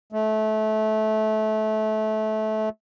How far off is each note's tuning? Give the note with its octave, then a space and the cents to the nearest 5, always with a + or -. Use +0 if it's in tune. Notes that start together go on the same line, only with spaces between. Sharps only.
A3 -25